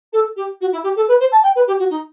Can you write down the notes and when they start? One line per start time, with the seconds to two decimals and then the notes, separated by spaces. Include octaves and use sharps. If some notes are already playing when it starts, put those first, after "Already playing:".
0.12 A4
0.36 G4
0.60 F#4
0.72 E4
0.83 G4
0.95 A4
1.07 B4
1.19 C5
1.31 A5
1.42 G5
1.55 B4
1.67 G4
1.78 F#4
1.89 D#4